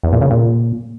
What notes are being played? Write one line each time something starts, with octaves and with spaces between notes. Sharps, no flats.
E2
A#2
C#3
A#2